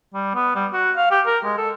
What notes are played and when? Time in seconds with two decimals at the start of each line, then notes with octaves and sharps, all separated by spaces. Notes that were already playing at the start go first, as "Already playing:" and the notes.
0.14 G3
0.35 B3
0.55 G3
0.73 F#4
0.96 F5
1.11 G4
1.26 A#4
1.44 G#3
1.57 A4